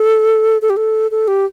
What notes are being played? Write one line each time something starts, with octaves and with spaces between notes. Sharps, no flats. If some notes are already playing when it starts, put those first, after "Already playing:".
Already playing: A4
A4
G4
A4
A4
G4